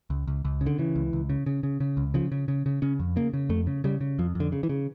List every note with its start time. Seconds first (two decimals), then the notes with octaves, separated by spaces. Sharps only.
0.10 C#2
0.27 C#2
0.45 C#2
0.61 C#3
0.66 D3
0.79 C#3 E3
0.95 C#2
1.13 C#2
1.30 C#3
1.46 C#3
1.63 C#3
1.80 C#3
1.97 C#2
2.14 C#3 F3
2.32 C#3
2.48 C#3
2.66 C#3
2.82 C#3 C#4
2.99 F2
3.16 C#3 A#3
3.33 C#3
3.49 F2 A3
3.67 C#3
3.84 C#3 G3
4.01 C#3
4.19 F2 F3
4.35 F2 D3
4.52 C#3
4.63 E3
4.69 C#3